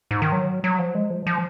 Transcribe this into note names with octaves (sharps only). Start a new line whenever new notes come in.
G#2
D#3
F#3
F#3
F3
G#3
F3
F3